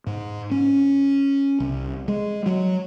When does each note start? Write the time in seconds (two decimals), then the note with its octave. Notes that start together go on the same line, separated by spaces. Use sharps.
0.07 G#2
0.51 C#4
1.60 C2
2.08 G#3
2.46 F#3